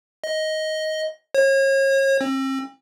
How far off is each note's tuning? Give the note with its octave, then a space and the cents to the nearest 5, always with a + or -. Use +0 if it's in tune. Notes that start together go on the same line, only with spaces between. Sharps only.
D#5 +10
C#5 -35
C4 +40